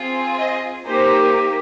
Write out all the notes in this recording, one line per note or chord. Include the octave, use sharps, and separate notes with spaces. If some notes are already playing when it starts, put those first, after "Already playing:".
Already playing: C4 F4 G#4
D#5
A#3 D#4 G4 C5